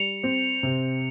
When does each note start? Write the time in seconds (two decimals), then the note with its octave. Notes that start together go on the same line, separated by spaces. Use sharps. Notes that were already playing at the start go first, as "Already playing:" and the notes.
Already playing: G3 C#7 F7
0.24 C4
0.63 C3